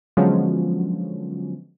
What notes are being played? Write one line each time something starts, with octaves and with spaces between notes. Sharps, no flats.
D3 F3 F#3 G#3 B3 C#4